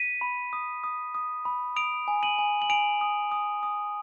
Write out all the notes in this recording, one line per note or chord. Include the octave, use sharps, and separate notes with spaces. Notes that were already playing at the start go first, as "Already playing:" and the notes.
Already playing: B6 D#7
B5
D#6
D#6
D#6
B5
D#6 D7 F7
G#5
D#7 F#7
G#5
F#7
G#5 D7 F7
D#6
D#6
D#6